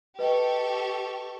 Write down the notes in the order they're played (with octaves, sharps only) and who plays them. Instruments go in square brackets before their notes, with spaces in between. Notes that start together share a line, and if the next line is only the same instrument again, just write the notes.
[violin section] G4 A4 C#6 [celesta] B4 D#5 G5